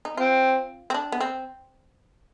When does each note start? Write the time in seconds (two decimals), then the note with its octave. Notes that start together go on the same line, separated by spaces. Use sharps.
0.05 D#4
0.17 C4 F4
0.90 C4
0.94 D4
1.12 B3
1.20 C4